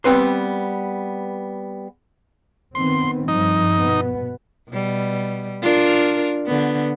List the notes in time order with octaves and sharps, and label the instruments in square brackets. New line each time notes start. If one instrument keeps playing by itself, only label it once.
[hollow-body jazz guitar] G3 B3 C4 B4 C6
[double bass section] D#3 B3 C4 [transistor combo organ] C6
[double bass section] G2 F3 [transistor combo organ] D#4
[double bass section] B2 B3
[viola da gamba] B2 G3
D4 F4 A#4
D3 B3